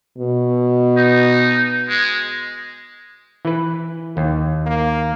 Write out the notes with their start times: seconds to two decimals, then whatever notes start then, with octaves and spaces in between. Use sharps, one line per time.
0.18 B2
0.97 D#4
1.88 G#3
3.45 E3 B4
4.17 D#2
4.66 A#3